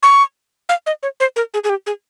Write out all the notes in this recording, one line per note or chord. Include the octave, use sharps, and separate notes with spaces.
C#6
F5
D#5
C#5
C5
A#4
G#4
G#4
G4
G#4